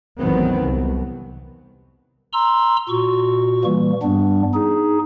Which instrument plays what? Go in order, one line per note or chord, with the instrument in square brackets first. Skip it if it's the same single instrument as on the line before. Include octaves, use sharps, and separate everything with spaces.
[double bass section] A1 E2 D#3 F#3 B3 C4
C2
[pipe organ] A#5 C6 E6
A#2 F#4 C#6
E3 G3 A#3
G2 G3 B3 D4
D#4 G#4